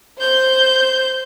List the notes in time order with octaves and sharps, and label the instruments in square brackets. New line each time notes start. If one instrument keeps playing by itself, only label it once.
[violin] C5 G6